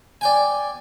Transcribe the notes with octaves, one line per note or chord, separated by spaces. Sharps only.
D5 G5 G#5